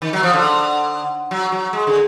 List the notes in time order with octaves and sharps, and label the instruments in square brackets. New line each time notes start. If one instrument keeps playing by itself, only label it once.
[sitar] D#3
F#3
F3
D3
F#3
F#3
G#3
D3